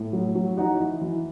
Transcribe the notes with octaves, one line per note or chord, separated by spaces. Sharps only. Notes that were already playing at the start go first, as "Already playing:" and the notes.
Already playing: A2
F#3
F#3
E3 D#4 F#4
E3
E3